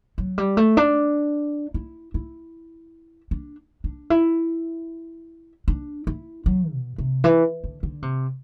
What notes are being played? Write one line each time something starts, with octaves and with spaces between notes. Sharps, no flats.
F#3
G3
A3
D4
E4
E4
D4
D4
E4
D4
E4
F#3
B2
C3
E3
D3
D3
C3